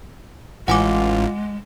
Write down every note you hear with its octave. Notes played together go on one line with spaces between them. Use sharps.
A1 G#3 F4 F#5 G#5 D6